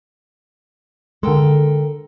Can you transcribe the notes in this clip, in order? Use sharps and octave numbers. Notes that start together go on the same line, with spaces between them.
D3 G#3 A4 A#4 G5